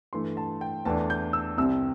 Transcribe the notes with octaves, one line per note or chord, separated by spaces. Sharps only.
G2 E3 A3 C6
A5
G5
E2 E3 A3 D4 A5
G6
E6
C2 C3 G3 C4 E6